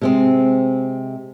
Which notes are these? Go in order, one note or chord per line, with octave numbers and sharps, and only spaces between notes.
C3 G#3 C4